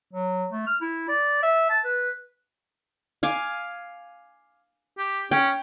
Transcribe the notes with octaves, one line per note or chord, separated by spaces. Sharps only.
F#3
A3
F6
E4
D5
E5
A5
B4
F5 G#5 D6
G4
C#4 G5